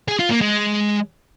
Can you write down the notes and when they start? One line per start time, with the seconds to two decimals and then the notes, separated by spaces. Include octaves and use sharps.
0.08 G#4
0.19 F4
0.30 A#3
0.41 G#3